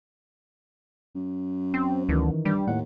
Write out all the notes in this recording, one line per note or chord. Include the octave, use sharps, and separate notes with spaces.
F#2
C4
D2 D#3 E3
G2 G3
D#2 A2 F#5